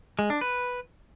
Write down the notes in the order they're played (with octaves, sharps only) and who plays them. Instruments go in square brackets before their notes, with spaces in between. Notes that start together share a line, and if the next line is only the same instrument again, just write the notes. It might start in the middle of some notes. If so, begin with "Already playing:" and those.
[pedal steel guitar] G#3
D4
B4